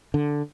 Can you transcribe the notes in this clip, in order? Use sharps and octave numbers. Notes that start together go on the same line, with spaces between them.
D3